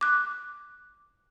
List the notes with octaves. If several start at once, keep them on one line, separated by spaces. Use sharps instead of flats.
D6 F#6